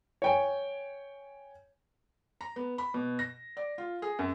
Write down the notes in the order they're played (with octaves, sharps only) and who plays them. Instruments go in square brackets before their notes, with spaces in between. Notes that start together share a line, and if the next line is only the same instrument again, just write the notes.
[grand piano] C#5 G5 G#5
[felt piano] A#5
B3
B5
B2
A#6
D5
F4
G#4
F#2